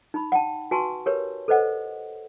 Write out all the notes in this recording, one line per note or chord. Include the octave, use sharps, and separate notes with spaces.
D#4 B5
F#5 G5 A5
F#4 B4 G#5 A5 C6 C#6
G4 A#4 B4 C#5
A4 B4 C5 D#5 F#5